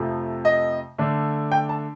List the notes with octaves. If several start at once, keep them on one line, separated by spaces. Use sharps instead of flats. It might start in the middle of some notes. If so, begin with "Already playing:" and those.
Already playing: F2 C3 F3 A3
D#5
D3 A3 D4
G5
A5